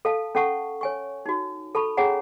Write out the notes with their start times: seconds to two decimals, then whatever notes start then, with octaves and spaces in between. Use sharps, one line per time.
0.05 A4 F5 A5
0.35 C#4 A4 F#5 A5 C#6
0.81 C#5 G#5 C#6
1.26 D#4 F#4
1.75 A4 A5 B5 C#6
1.97 C#4 G#4 C#5 F#5 G#5 A#5